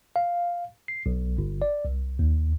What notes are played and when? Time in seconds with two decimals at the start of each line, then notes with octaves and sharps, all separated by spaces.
0.16 F5
0.88 C7
1.06 B1
1.38 G1
1.62 D5
1.85 C2
2.19 D#2